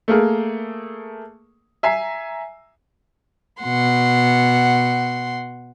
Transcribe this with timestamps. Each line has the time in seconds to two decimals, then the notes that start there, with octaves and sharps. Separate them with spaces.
0.08 A3 A#3 G#4 A#4
1.83 E5 G#5 A#5 C7
3.61 B2 F#5 C6